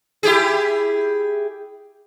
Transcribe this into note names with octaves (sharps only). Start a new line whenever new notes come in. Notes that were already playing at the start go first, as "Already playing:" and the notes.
E4 G4 G#4